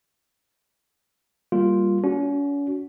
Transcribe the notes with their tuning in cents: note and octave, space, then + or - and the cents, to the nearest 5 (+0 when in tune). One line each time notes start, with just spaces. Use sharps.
G3 +5 A#3 +0 F4 +0
C#4 +40 F#4 +0